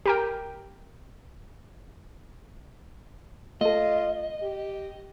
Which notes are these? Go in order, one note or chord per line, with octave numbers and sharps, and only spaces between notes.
G4 A#4 G5
A3 F4 A4 D#5
G4